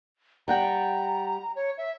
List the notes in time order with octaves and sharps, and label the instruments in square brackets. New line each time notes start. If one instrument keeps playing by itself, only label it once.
[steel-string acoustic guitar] G3 F#5 G5 [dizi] A#5
[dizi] C#5
E5